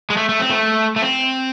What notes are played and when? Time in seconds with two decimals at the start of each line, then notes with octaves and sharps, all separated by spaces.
0.10 G#3
0.17 A3
0.29 A3
0.40 C4
0.51 A3
0.96 A3
1.02 C4